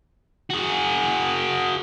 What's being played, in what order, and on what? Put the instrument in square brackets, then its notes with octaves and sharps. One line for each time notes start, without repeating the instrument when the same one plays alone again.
[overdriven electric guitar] F#4 G#4